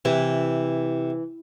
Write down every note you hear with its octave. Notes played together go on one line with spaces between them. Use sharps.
C3 E3